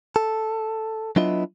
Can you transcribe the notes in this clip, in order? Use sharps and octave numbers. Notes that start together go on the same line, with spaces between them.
A4
F#3 B3 D4 E4 F4 D#5